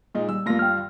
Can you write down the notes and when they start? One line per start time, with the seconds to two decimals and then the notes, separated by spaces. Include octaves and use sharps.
0.15 A#2 G#3 D#4
0.29 G3 E6
0.46 G2 A3 A#3 F4 A#6
0.59 G5 F6